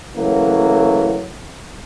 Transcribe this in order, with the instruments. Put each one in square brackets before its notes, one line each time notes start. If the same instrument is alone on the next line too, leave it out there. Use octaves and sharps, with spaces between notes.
[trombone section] C#3 E3 F#3 A3 A#3